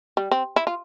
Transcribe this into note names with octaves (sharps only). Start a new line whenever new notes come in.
G3
C4
E4
F4